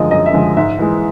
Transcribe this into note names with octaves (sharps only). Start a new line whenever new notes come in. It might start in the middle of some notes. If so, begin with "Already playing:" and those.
Already playing: F#2 D3 F3 G#3 D#5
F#2 D#5
E5
D3 F3 G#3
G#2 E5
E3 G#3